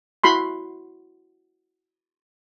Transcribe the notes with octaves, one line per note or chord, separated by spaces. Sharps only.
E4 F#4 B5 C6